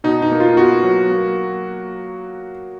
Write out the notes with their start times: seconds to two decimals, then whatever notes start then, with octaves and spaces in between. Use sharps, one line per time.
0.04 B2 D#4
0.22 D#4
0.32 A#3
0.40 F4
0.57 B3 F#4
0.84 F#3
1.11 A#3